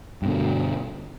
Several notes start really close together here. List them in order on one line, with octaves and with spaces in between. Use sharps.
G2 B2 D3